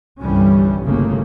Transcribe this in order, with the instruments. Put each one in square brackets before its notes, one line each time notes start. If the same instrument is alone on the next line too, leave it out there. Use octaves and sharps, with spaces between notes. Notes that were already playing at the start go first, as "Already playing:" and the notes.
[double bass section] G1 C2 G2 E3 G3 C#4
G1 C2 C#3 A3 A#3